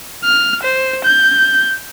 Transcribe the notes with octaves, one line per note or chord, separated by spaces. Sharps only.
F6
C5
G6